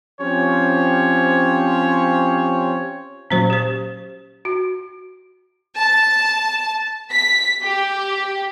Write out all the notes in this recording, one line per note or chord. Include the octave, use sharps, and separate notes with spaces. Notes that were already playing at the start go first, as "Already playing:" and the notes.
F3 C4 C#4 G4 C5 C#5
A#2 F#3 C#4 C5
G4 C5
F#4
A5
B6
G4